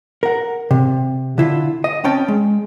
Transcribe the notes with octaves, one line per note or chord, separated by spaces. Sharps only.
A#4 F#5
C3
D3 E4 F4
D#5
C4 C#4 G5 A5
G#3